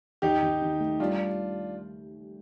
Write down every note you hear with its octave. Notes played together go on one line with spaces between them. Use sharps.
D#2 D#4 G4
D#2
D#3
A3
G3 D4 F4